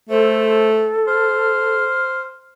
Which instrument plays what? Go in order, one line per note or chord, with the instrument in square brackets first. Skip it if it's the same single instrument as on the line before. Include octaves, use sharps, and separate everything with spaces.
[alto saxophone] A3 [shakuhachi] A4 [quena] C5
[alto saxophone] C5 [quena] F6